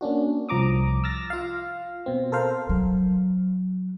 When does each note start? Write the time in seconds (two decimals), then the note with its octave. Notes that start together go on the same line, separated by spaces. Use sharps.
0.01 A#3 C#4 D4 F#4
0.49 C2 F3 A#5 D6 D#6
1.04 E6 F6 A6 A#6
1.30 F4 F5
2.06 B2 C4
2.32 A4 A#4 C5 F5
2.69 F#3